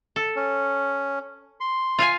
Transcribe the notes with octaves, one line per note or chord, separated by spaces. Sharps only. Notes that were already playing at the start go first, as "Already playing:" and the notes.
A4
C#4
C6
F4 F5 G#5